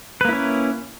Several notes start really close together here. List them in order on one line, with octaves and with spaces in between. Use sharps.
B4 A#3 E4 C#4